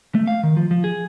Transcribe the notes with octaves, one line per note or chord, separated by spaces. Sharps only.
A3
F5
D#3
F3
F3
G#4